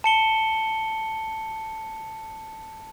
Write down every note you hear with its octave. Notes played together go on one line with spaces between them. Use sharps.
A5 C#7 G7